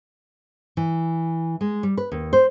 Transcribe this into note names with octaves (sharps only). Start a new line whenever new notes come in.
E3
G#3
G3
B4
D#2
C5